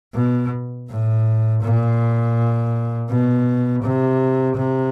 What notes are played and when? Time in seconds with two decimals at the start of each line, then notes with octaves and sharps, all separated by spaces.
0.14 B2
0.89 A2
1.63 A#2
3.09 B2
3.83 C3
4.56 C3